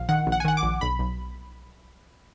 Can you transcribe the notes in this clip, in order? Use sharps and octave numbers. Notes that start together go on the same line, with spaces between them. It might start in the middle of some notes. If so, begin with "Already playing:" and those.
Already playing: A#1 F5
D#3 F#5
A#1
F#5
G#5
D#3 F#5
D6
A#1
B1 B5
B1